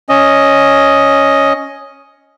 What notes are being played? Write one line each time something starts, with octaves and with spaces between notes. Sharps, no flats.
C#4 D#5